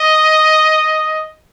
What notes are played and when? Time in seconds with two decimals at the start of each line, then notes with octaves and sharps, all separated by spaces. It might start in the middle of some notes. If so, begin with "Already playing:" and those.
Already playing: D#5